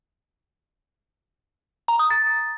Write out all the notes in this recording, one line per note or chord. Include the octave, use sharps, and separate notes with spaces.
A#5
D#6
A6